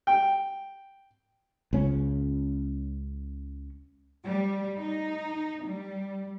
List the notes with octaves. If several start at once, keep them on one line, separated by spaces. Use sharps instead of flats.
G5
C#2 C#4
G3
D#4
G3